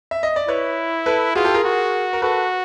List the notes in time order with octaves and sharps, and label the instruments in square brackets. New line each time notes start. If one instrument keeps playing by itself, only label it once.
[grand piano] E5
D#5
D5
[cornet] E4 [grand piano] B4 C#5
[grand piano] A4 B4
[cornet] F4 [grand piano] F#4 G#4
[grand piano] G4 A4
G#4 A#4
[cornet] F#4
[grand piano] A#4
[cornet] F#4 [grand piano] A4 B4